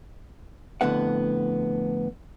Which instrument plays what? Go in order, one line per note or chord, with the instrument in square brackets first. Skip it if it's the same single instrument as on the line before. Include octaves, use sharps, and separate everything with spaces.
[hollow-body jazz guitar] F2 A2 D3 B3 F#5